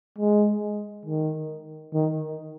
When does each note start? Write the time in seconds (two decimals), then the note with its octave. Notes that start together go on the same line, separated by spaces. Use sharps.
0.18 G#3
1.06 D#3
1.94 D#3